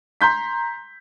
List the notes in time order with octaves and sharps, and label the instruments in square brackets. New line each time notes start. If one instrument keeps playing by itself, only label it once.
[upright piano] A#5 C6 G6 B6